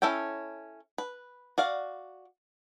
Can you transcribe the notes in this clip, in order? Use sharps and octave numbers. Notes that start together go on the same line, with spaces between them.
C#4 E4 A4 C#5 G5
B4
F#4 D5 F5